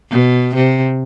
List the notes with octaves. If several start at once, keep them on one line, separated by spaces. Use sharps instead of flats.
B2
C3